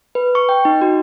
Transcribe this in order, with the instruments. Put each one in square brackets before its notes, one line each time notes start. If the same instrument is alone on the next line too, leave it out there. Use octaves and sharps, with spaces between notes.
[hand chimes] B4
C#6
G5
D#4
F#4